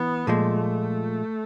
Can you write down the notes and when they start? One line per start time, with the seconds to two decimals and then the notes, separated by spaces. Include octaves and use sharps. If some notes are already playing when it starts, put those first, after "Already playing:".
Already playing: E3 B3
0.27 A#2 F3 G#3 A3